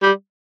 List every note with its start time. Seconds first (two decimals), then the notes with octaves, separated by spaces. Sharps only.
0.03 G3